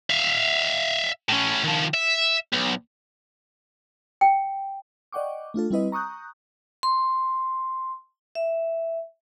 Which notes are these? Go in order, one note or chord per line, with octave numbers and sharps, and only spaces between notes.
E5 F5
A2 C#4
D#3 F3
E5
B1
G5
D5 D#5 F#5 G5 C#6 D6
A3 D4 F4 A4
G3 C4 E4 B4 D#5
A#5 C#6 D#6 F#6 G6
C6
E5